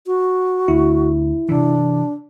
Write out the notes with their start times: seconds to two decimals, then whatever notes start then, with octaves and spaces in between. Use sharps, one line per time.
0.06 F#4
0.68 D2 E4
1.49 C3 E3 D4